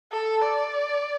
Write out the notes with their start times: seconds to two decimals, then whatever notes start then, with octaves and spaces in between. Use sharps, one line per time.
0.12 A4
0.42 D5